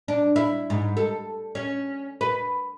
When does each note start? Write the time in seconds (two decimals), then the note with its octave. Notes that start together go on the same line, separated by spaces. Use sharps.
0.08 D4
0.36 E4
0.70 G#2
0.97 A4
1.55 C#4
2.21 B4